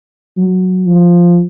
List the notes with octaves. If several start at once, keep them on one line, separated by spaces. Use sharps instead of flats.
F#3
F3